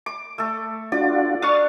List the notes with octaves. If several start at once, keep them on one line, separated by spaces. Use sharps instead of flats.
D6
A3 A4
D4 F4 F#4 D5
D4 C#6 D#6 F6 A6